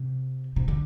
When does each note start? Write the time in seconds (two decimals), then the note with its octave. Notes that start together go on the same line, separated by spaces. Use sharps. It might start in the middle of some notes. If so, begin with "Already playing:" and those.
Already playing: C3
0.56 C3
0.68 D3